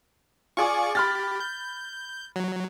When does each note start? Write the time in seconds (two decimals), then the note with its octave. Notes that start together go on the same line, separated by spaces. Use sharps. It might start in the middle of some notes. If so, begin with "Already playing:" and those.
0.57 F4 G#4 D5 C#6 D6
0.95 G4 B5 F6 A6
1.40 G6
2.36 F#3